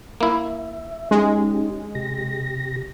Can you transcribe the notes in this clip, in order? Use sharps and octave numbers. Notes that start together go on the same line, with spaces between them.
A#3 E4 E5
G#3 C#4 D#4 G4
C3 G4 A#6